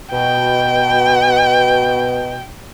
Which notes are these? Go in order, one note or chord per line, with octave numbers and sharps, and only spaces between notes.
B2 G5